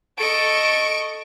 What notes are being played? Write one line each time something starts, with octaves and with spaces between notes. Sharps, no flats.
A4 D#5 C#6 D7